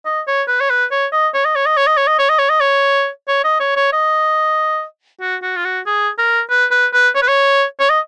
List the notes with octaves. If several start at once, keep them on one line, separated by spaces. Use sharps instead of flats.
D#5
C#5
B4
C#5
B4
C#5
D#5
C#5
D#5
C#5
D#5
C#5
D#5
C#5
D#5
C#5
D#5
C#5
D#5
C#5
C#5
D#5
C#5
C#5
D#5
F#4
F#4
F4
F#4
G#4
A#4
B4
B4
B4
C#5
B4
C#5
C#5
D#5